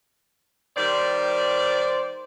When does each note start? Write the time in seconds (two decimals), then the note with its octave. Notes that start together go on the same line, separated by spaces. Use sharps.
0.76 D#3 G3 C5 D5